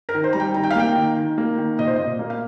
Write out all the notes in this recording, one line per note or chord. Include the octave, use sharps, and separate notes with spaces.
A#4
D#3
C5
G3 A#5
G5
D#3 A#5
G5
F5
A#3 G5
D#3
D#3
A#3
D#3
A#2 D#5
C5
A#2 D#5
A#3
F5